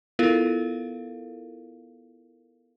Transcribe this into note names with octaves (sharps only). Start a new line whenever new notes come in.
B3 E4 F4 A4 A#4 F5